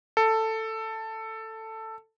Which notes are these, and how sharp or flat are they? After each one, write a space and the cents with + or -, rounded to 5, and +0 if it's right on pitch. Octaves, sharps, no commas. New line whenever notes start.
A4 +10